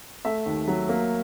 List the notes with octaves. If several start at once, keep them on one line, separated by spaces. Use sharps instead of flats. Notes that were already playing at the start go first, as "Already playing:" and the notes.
A3 E5
D#2
F#3
A#3